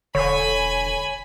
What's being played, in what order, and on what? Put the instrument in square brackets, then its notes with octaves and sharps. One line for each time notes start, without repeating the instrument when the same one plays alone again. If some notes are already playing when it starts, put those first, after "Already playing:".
[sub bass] E1 [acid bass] D3 [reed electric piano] C#5 [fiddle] G#5 B5